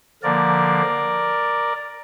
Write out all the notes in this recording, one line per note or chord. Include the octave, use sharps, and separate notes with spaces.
D3 F3 A#3 A#4 D5